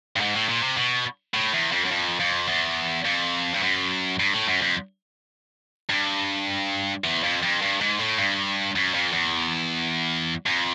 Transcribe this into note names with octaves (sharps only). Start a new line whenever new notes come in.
G2
G#2
A2
A#2
C3
B2
A2
E2
F2
F#2
F2
F2
E2
F2
G2
F#2
G2
A2
F#2
F2
G2
E2
F2
F2
G2
G#2
A2
G2
F#2
F2
E2
F2